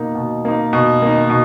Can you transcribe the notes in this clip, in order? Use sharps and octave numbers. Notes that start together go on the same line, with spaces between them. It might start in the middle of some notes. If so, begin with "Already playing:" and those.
Already playing: B2 A#3 D#4
B2
A#3 D#4
B2
A#3 D#4
B2